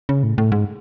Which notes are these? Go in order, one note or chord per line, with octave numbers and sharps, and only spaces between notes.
C#3
A2
A2
G#2